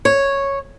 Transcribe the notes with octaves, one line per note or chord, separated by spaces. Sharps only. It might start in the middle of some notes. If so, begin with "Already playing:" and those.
C#5